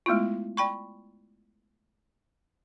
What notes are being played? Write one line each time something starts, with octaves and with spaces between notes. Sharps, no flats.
G#3 A3 B3 E4 F4
D5 G5 B5 C#6